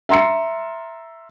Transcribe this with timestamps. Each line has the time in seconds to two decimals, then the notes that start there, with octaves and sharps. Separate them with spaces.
0.09 E5 A#5 C6 E6 C#7